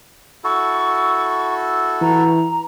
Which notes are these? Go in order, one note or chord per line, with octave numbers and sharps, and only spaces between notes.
E4 F#4 A4 C#6
E3 A#5